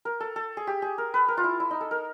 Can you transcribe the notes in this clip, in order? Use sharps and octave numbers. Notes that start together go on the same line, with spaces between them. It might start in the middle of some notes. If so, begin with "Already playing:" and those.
A#4
A4
A4
G#4
G4
G#4
A#4
B4
A#4
F4
E4
E4
D#4
A4
A#4